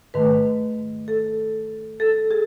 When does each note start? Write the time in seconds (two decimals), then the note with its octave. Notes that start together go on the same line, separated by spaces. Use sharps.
0.14 G#2 D#3 A3 B4
1.08 A4
2.00 A4
2.31 G#4